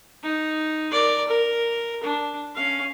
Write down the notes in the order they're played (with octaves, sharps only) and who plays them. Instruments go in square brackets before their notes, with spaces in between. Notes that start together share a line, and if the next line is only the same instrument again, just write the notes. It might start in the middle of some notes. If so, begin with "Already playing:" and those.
[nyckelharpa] D#4
A#4 D5
A#4
D4
C#4 F5